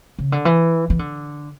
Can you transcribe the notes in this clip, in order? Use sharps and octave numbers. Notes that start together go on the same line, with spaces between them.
C#3
D3
E3
E3
D3